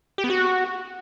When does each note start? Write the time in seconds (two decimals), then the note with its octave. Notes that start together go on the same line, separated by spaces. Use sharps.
0.18 G4
0.24 B3
0.30 F#4